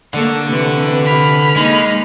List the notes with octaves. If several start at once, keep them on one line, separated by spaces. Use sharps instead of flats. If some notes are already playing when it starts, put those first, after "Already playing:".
D3 A#3 A4 C#6
C3 E3 B4
B5 F6
G#3 A#3 D#4